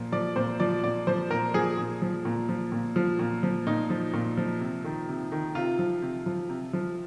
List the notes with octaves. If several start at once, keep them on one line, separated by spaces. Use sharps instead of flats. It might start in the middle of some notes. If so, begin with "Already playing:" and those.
Already playing: A#2 F3
F3 D5
A#2 C5
F3 D5
A#2 D5
F3 C5
A#2 A#4
F3 G#4
A#2
F3
A#2
F3
A#2
F3
A#2
F3
A#2 D#4
F3
A#2
F3
C3
D#3
C3
D#3
C3 F4
F3
C3
F3
C3
F3